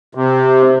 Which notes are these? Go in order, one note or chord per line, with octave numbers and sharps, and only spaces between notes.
C3